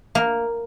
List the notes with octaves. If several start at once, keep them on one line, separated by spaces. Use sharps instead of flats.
A#3